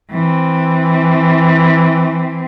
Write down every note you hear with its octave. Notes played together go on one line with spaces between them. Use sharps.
E3 C4